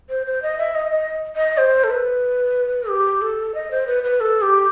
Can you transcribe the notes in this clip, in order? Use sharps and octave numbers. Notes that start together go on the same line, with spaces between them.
C5
C5
D#5
E5
D#5
D#5
D#5
C5
A4
B4
G4
A4
D#5
C5
B4
B4
A4
G4